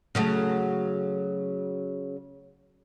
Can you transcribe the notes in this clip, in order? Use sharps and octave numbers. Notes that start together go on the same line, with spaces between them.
C#3 F#3 A3